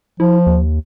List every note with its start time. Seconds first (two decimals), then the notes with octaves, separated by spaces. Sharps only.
0.20 F3 E4
0.47 D#2